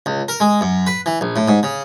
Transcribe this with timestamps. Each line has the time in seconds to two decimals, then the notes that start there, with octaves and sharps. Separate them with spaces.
0.06 C#2
0.28 A#4
0.40 G#3
0.61 F#2
0.87 B4
1.06 E3
1.21 A#1
1.36 A2
1.48 G#2
1.63 C#3